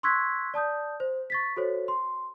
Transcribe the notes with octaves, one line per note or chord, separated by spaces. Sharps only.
C6 C#6 E6 F#6 G#6 B6
D5 A5 D#6 G6
C5
C#6 A6 B6
F#4 A4 C5 C#5
C6